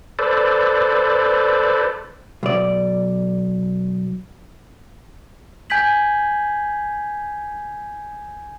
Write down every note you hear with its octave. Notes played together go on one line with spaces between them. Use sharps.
A4 B4 C5 D5
B1 D5
G#5 G6 G#6 B6 F#7